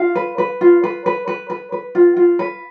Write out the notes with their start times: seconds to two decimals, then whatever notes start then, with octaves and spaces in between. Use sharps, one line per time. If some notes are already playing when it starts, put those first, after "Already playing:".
Already playing: F4 F5
0.15 B4
0.38 B4
0.61 F4
0.84 B4
1.06 B4
1.28 B4
1.50 B4
1.72 B4
1.95 F4
2.17 F4
2.39 B4